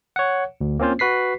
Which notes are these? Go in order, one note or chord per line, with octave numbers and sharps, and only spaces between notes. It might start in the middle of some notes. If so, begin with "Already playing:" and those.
C#5 F#5
D2
A#3 C4 C#4 F4 C5
F#4 B4 B6 C7